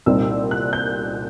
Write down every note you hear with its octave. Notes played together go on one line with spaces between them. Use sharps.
C2 A#2 G3 C4 D#4 E6
F#6
G6